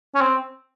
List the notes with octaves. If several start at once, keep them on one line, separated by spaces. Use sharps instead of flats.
C#4
C4